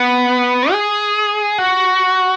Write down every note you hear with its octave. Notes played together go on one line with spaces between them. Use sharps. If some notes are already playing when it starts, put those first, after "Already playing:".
Already playing: B3
G#4
F#4